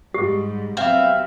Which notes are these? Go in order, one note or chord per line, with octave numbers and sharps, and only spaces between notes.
G#2 G3 G4
C3 F#3 B3 C4 E5 F5